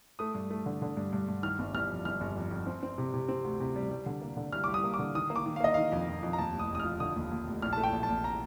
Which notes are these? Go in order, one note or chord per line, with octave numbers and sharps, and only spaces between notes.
A3 D#6
G2
A3
D3
D3
G2
G2
G2
D#3 F6
G1
G1 F6
F2
G1 F6
G1
F2
F2
C4
C4
C3
C3
C4
D2
C3
G3
G3
D3
A#3
D3
G3 F6
G3 D6
D#6
A#3
D6
D3
D#3 D#6
A#3
D6
D#3
F5
A#3 D#5
D#3 F5
F2
F2
F2
A#5
D#2 A5
F1
D#6
F1
D#6
F6
F3
D3 D#6
D#2
D#2
F1
A#1 F6
A3 A5
G5
A#1
A5
A#1
A#5